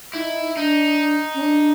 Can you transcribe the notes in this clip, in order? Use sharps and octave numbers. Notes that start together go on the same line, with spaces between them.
D#4 E4
D4 D#4
C#4
D4